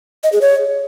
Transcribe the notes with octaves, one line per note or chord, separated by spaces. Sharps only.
D#5
G#4
C#5